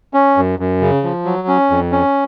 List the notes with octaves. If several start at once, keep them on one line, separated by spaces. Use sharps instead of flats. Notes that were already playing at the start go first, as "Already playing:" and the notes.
C#4
F#2
F#2
C#3
F3
F#3
C#4
F2
C#4